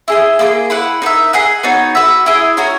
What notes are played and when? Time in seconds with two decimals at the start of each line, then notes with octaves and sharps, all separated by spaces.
0.08 E4 G#4 D#5
0.39 A#3 E4 G#4
0.70 E4 B4 F#5
1.02 D#4 A#4 E5
1.33 G#4 D#5 F#5
1.63 B3 D#4 F#4 C#5
1.95 F#4 B4 E5
2.26 E4 G#4 D#5
2.57 C#4 F#4 A#4 C#5